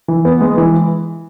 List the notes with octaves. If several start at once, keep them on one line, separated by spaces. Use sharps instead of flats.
E3
B3
G#3
E3